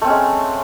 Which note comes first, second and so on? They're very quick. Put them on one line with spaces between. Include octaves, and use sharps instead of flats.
A3 C4 C#4 G#3